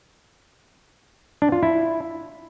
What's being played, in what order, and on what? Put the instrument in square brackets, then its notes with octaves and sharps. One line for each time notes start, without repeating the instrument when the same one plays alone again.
[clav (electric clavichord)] D4
F4
E4